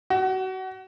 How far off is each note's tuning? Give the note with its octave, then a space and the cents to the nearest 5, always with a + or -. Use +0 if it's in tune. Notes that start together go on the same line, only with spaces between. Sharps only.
F#4 +30